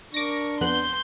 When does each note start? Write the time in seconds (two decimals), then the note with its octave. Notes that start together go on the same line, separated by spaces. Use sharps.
0.14 D4 A#4 C#6 D6 A#6
0.61 F2 B3 C6 F#6 G6